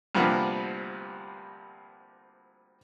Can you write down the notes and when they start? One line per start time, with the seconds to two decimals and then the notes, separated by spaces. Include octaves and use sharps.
0.15 D2 G2 C3 F3 A#3 B3